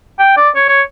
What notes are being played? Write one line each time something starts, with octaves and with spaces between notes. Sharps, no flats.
G5
D5
C#5
C#5